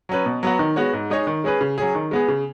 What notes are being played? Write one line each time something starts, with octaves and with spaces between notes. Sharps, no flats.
F#3 C#4 B4
B2
F#3 B3 F#4
D#3
G#3 B3 F#4 C#5
G#2
G#3 D#4 G#4 C#5
D#3
G#3 C#4 G#4 B4
C#3
F#3 C#4 G#4
D#3
G#3 B3 G#4
C#3